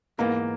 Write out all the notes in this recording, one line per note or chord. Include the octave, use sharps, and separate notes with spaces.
G#2 E3 A#3 B3 D#4